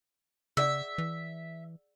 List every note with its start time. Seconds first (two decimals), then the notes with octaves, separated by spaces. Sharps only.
0.57 C#3 G#4 D5 E5 F#5
0.98 E3